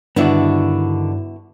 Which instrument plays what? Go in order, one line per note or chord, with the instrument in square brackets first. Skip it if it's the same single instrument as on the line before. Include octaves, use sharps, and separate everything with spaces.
[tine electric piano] G2 [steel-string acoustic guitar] D3 D#3 D4 [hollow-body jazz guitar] B3 E4 F#4